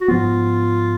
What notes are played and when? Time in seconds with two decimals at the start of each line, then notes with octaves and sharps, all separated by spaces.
0.01 F#4
0.08 G#2 F3 B3 F4